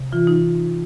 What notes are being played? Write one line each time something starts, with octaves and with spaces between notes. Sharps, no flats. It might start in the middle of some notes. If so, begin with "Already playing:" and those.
Already playing: C3
E3 F4
D#4